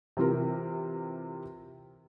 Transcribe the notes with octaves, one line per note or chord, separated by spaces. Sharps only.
C3 E3 F4 A#4